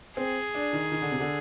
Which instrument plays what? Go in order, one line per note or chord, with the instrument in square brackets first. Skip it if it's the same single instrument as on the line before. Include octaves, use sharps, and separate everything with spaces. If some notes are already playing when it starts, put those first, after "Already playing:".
[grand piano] C4 [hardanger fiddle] G#4
[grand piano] D4
D#3
D#3
D3
C3
D3